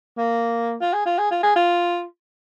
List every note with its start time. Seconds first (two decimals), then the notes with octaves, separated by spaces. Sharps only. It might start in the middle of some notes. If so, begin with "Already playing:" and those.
0.17 A#3
0.81 F4
0.94 G#4
1.06 F4
1.18 G#4
1.31 F4
1.43 G#4
1.56 F4